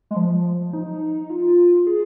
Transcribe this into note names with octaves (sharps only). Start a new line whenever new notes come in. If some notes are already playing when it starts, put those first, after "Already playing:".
G#3
F3
D#4
F4
G#4